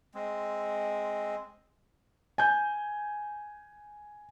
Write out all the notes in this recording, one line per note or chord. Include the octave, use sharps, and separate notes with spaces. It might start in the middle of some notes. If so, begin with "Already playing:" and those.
G#3 C4
G#5 G6